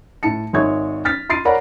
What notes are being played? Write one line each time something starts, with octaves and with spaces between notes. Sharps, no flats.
A2 A5 C#7
G#1 G#3 C#5 E5 C#6 G#6
F6 A6 B6
C6 A6 C7 D7 D#7
A#4 C#5 D5 F#5 A#5 B5